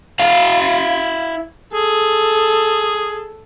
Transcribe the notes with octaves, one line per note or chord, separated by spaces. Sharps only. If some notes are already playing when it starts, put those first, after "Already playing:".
E4 F5
G#4 A4